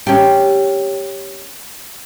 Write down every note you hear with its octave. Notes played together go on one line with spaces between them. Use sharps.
C#4 G4